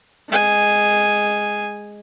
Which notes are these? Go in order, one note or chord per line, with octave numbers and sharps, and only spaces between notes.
G#3 G#5